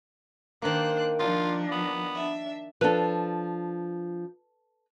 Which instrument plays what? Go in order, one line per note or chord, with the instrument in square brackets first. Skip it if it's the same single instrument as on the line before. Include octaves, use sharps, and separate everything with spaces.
[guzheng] D#3 A#3 [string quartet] D4 C5 F#6
[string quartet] F3 D4 [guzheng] D#4 [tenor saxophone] F4
[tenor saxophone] B3
[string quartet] D4 E5
[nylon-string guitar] F3 D4 [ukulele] A4 B4